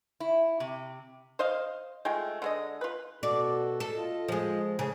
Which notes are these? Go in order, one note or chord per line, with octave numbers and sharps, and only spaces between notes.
E4
C3
C5 D#5 F5
G#3 A3 F4 G5
D3 G#3 D#5
F4 B4
B2 F#4 A4 D5
A4
F4 D#5
F3 G#3
A2 C#3